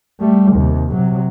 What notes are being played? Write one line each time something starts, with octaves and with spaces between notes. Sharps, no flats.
G3 A3
D#2 C3
C3 F#3